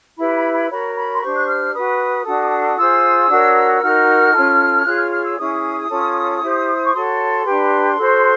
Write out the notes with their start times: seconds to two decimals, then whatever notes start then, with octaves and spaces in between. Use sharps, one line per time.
0.16 E4 G4 B4 B5
0.35 B5
0.52 B5
0.68 F#4 A#4 C#5 B5
0.95 B5
1.12 C6
1.21 D4 G4 C5 C#6
1.35 F#6
1.46 F6
1.73 F#4 B4 D#6
2.24 D4 F#4 A4
2.77 F4 G#4 C5 E6
3.29 D4 F#4 A#4 C#5
3.81 D#4 F#4 A#4 F6
4.32 C#4 F4 A4
4.84 F4 G#4 C#5 F#6
4.97 F6
5.10 F6
5.23 E6
5.37 C#4 E4 G#4 D#6
5.88 C#4 F4 A4 C#5
6.41 E4 G4 C5
6.84 C#6
6.92 F#4 A4 C#5 C6
7.44 D4 G4 B4
7.96 F#4 A4 C5